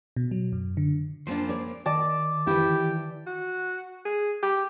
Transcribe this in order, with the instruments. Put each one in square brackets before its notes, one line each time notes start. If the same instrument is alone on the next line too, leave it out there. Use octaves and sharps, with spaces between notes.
[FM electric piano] B2
F#3
F#2
D3
[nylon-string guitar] F3 C#4 D4 [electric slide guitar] A#3 C5
[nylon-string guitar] C#5 D5
[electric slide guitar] D#3 [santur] D5 A5 [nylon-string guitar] D#5
[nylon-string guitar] E3 E4 [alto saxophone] G4
[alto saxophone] F#4
G#4
G4